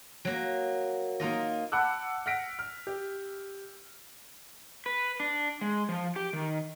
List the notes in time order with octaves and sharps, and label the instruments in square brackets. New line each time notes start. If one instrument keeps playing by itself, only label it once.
[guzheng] F#3 A#3
A#3 D#4 F4 D#5
[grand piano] F#5 A5 B5 D6 E6 F#6
F#5 F6 A#6 B6 D7
F6
G4
[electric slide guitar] B4
D4
G#3
F3
G4
D#3